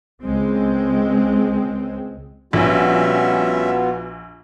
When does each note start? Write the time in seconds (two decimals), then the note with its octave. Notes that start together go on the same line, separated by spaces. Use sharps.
0.22 C#2 G#3 C4
2.53 A#1 G3 B3 C#4 F4 F#4 E5